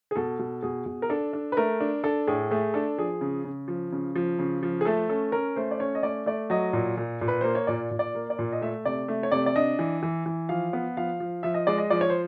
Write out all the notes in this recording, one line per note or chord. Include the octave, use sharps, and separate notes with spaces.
G#4
B2 A4
B2
B2 G#4
B2
A#4
D4 A4
D4
B4
A3 A#4
D4
D4 A4
A2 G#4
A3 G#4
D4 A4
F3 G#4
C#3
C#3
F3
C#3
F3
C#3
F3
G#4
A3 A4
C#4 A4
C#4 A#4
A3 C5
D5
C#4 C#5
D#5
A3 D5
A3 D5
F#3 D#5
A#2
A#2
A#2
B4
A#3 C5
C#5
A#2 D5
A#2
D5
A#3
D5
A#2
D#5
A3 E5
C3 D5
A3
C#5
C3 D5
D5
D4 D#5
E3
E3
E3
F3 F5
B3
F3 F5
F3
F3 E5
D#5
G#3 D5
D#5
F3 D5
C#5
C5